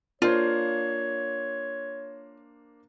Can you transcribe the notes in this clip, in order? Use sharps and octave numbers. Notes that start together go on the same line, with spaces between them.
A#3 D4 F4 C5 C#5